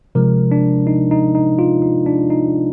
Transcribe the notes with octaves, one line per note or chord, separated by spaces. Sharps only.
C3 F3 G#3 A#4
D4
D#4
D#4
D#4
F4
D#4
D4
D#4